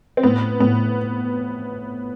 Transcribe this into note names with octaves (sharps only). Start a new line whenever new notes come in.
C4
A2 B3
A2 B3